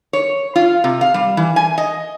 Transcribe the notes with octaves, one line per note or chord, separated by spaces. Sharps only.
C#5
F4
C3
F5
G3
E3
G#5
D#5